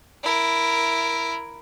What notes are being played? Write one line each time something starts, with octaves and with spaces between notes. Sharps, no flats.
E4 A#4